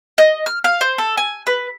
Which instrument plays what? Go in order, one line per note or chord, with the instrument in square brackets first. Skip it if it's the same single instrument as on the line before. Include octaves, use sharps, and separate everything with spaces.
[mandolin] D#5
F6
F5
C5
A4
G#5
B4